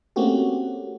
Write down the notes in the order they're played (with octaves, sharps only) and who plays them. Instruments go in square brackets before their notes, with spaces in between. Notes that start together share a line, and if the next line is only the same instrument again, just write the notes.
[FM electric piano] A3 A#3 C4 C#4 F#4 G4